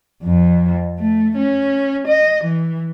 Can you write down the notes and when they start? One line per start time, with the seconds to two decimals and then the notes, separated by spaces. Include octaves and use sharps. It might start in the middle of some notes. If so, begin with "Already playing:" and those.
0.24 F2
0.99 A3
1.37 C#4
2.08 D#5
2.45 E3